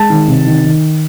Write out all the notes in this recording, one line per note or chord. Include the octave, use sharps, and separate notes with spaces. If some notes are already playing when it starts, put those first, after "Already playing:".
Already playing: G#3 A5
D#3
C3
D#3
D#3